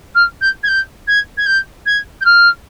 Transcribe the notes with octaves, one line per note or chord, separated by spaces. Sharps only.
F6
G6
G#6
G6
G#6
G#6
G6
G#6
G6
F6